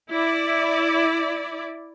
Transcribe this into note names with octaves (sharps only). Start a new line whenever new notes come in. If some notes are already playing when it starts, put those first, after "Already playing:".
E4 D5